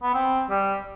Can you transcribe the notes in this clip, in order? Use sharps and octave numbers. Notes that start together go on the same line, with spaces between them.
B3
C4
G3